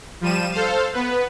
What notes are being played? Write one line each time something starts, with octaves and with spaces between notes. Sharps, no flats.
F3 G3 D#7 E7
A4 C5 F5
B3 B4